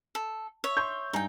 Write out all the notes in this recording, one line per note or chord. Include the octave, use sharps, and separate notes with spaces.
A4
C#5 E5
C6 C#6 G6
G2 D#4 G5 G#5